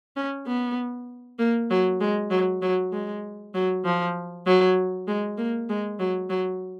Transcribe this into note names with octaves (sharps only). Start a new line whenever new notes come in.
C#4
B3
A#3
F#3
G#3
F#3
F#3
G#3
F#3
F3
F#3
G#3
A#3
G#3
F#3
F#3